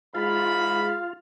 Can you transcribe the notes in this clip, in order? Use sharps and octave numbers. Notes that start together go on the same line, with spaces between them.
G#2 E3 G#3 F4 G#4 F5 B5